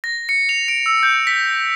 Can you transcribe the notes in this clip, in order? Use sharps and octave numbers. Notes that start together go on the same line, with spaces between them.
A#6
C#7
F7
D7
E6
G6
B6